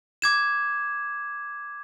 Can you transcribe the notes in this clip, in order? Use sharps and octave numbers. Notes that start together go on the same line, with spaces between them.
D6 G#6 E7